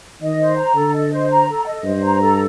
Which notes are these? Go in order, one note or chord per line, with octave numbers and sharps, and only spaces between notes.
D#3 D#5
C5
A#5
D3 A4
D#5
C5
A#5
A4
D#5
G2 C5
A#5
A4